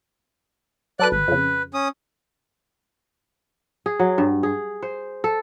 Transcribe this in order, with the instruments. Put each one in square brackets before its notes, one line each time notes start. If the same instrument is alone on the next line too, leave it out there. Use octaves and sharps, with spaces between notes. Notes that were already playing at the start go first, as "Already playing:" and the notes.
[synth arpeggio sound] F#3 A4 B4 [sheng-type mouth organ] D5 F#6
[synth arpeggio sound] G#1 [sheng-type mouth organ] B4
[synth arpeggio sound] F2 C#3
[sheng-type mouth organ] C#4 D#6
[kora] G#4
F#3
G2
G#4
C5
A4